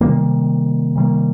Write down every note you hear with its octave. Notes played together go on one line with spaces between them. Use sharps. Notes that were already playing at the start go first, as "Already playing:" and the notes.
C3 D#3 G3 A#3
C3 D#3 G3 A#3